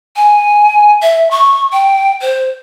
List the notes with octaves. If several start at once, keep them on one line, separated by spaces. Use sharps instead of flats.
G#5
E5
C#6
G5
C5